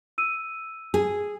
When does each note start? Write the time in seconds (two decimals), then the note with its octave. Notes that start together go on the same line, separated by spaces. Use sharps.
0.18 E6 D#7
0.94 G#4